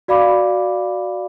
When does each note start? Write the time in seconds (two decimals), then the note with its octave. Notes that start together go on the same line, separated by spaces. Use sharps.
0.08 F#4 D5 F5 B5 D6